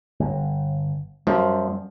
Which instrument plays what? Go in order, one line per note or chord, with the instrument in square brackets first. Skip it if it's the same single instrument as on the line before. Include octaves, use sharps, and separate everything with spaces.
[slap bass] G1
[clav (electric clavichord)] F#2 F3 [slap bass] G3